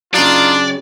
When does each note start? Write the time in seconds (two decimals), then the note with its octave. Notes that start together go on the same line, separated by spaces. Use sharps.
0.14 C#3 F#3 D4 D#4 F4 D5